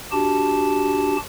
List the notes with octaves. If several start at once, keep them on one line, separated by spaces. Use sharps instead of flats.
D4 F#4 G4 A5